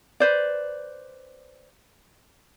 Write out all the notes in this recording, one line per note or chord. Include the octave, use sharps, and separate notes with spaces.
B4 C5 D5